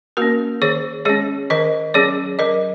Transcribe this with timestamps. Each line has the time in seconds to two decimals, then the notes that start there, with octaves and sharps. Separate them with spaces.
0.17 A#3 C#4 F#4 A#4
0.62 D#3 G#4 C#5
1.05 G#3 C#4 G#4 C#5
1.50 D#3 A#4 D#5
1.94 F#3 C#4 G#4 C#5
2.39 F#3 A#4 D#5